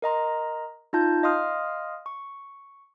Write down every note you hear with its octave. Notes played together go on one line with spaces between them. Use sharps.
A#4 D#5 A#5 C6
D#4 F4 A5 G6
D#5 F5 C6 D#6 F6
C#6